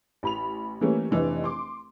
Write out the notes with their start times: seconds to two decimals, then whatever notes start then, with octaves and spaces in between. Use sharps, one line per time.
0.23 A1 B5 F7
0.81 E3 G3 A3 A#3 C#4
1.11 F1 E3 D4 D#4
1.44 C6 D6